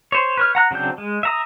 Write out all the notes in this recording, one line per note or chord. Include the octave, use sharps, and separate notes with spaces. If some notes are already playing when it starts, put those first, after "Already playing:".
C5 C#5
B4 C#5 F6
F#5 A#5 F#6
C#3 F#3 C4 D4 G6
G#3
E5 A#5 D#6